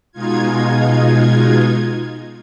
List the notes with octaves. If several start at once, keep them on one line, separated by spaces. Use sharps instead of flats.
B2 G#3 D#4 F4 G#6